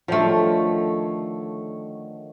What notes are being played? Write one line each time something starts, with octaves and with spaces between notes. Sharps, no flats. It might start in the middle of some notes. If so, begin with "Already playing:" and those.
D3 D#3 F3 A3 C#5